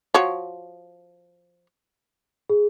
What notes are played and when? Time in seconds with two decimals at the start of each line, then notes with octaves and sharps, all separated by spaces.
0.14 F3 F#4 C#5
2.50 G#4